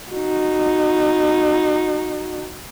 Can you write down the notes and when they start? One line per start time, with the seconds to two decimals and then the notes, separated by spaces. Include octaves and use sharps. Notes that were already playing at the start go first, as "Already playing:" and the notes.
0.11 D#4 F#4